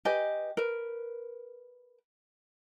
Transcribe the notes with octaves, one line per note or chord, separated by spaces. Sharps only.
G4 B4 D#5 G#5
A#4 B4